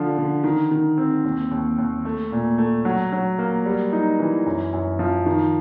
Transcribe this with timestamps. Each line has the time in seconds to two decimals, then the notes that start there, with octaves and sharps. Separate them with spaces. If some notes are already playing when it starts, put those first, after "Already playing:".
Already playing: D3 F3
0.18 D3
0.44 D#3
0.71 D#3
0.98 C4
1.24 D#2
1.51 D#2
1.78 D#2
2.05 A3
2.32 A#2
2.58 A3
2.85 F#3
3.12 F#3
3.38 A#3
3.66 G3
3.92 D#4
4.20 E3
4.46 F#2
4.73 F#2
4.99 F3
5.26 D#3